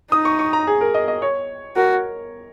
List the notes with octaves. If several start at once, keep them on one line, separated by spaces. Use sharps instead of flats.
D#4 D#6
C#6
C#6
A#5
G#4
A#4
D#5
D#5
C#5
F#4 A#4